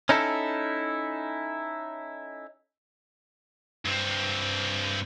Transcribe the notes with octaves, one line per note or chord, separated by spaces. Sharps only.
C#4 D#4 E4 A4
G2 C4